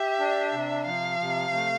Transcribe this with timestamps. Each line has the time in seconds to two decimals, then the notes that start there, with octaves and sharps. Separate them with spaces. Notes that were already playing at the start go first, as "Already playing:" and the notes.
Already playing: G4 E5
0.20 D4
0.53 C3
0.86 F3 F5
1.20 C3
1.54 A3